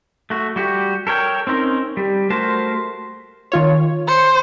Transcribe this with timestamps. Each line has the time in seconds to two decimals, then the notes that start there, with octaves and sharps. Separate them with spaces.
0.30 A3 F#4
0.56 G3 F#4 G4
1.07 A4 A#4 C#5 G5
1.47 C4 C#4 D#4 A#4
1.97 G3
2.30 A3 F#4 A#4 C5 A5
3.52 D#3 F4 C#5
4.08 C5 C#7